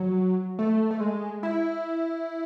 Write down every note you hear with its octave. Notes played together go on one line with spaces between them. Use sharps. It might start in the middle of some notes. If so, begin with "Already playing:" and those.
Already playing: F#3
A3
A3
G#3
E4